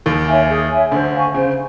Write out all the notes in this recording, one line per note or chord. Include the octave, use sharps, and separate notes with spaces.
D#2 D#3 G#4
C#5 E5 G#5
G#4
C#5 E5 G#5
D2 D3 C5
F5 G#5 C#6
C#3 C5